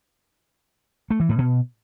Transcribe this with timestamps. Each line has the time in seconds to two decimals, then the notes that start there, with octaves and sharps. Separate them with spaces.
1.10 A3
1.20 E3
1.29 A2
1.38 B2